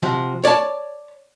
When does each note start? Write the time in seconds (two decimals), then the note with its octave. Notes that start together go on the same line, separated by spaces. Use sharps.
0.03 C3 F3 F#4
0.44 C#5 D5 F5 A5